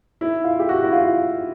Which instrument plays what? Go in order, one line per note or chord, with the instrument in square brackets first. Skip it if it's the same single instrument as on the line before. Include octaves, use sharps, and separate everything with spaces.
[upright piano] E4
F4
G4
F#4
E4
F4